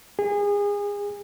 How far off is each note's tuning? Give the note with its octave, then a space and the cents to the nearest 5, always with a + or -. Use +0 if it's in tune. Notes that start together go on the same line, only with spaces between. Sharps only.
G#4 -30